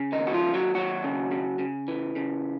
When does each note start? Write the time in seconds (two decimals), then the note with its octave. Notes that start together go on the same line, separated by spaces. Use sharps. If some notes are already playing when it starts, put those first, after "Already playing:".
Already playing: C#3
0.12 D#3 D#4
0.20 D#2
0.27 F#4
0.33 F3 F4
0.48 D#2
0.54 F#3 F#4
0.75 D#2 F#3 F#4
1.04 C#3
1.31 C#3
1.59 C#3
1.88 E3
2.16 C#3